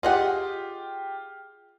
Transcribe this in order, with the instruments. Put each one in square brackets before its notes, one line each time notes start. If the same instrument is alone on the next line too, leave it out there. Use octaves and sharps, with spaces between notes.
[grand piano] F4 G4 [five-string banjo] G#4 D#5 F#5